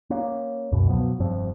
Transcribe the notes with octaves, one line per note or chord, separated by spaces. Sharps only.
A#3 C#4
C#2 F#2 B2
B2 F3 F#3 B3
F1 G2 F3 C4